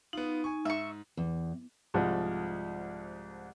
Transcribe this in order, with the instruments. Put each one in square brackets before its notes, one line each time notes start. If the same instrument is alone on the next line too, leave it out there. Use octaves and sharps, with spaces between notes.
[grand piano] B3 F4 [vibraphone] D#4
[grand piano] G#5 C#6
[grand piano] G#2 [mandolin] E5 C#6
[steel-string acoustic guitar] E2
[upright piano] C2 G#2 F3